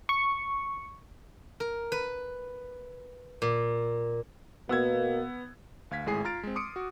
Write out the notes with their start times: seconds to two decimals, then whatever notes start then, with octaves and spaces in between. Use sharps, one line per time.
0.09 C#6
1.60 A#4
1.92 B4
3.42 A#2
4.69 B2 A#3 B3 E6 G#6
5.91 D2 F5 G#6 B6
6.06 G#1 A2 G#3 G#4 G#5 C7
6.24 F4 A#5 F6 A6 D7
6.43 G#3 C4
6.55 C6 D6 D#6 C#7 D7
6.76 F#4